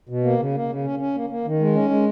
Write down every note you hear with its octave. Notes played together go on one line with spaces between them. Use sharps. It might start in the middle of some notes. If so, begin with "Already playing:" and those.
B2
A#3
C#3
A#3
C#3
C#4
C#4
A#3
A#3
D#3
G#3
C#4
G#3